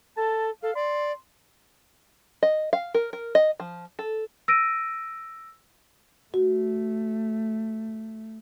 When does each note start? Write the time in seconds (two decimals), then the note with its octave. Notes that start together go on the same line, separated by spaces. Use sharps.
0.17 A4 A5
0.63 A4 F5
0.75 D5 C6
2.43 D#5
2.73 F5
2.94 A#4
3.13 A#4
3.35 D#5
3.60 F3
3.99 A4
4.48 E6 A#6 D7 D#7
6.34 A3 F#4